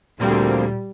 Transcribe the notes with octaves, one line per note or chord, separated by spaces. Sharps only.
D2 A#2 F3 G3 A#3 C4